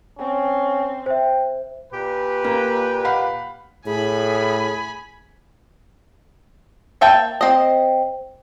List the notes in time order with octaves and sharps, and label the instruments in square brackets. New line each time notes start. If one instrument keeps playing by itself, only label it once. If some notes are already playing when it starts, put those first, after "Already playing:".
[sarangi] C4 [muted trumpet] C#4
[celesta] C5 E5 [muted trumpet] G5
[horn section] A#2 G4 B4
[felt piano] A#3
F5 F#5 B5
[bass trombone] A2 [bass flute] G#4 [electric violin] G#5 B5
[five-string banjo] A#3 E5 G5 A5
C4 D#5